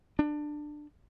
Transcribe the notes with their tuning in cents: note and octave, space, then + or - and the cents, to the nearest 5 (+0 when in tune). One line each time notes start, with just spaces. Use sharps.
D4 +20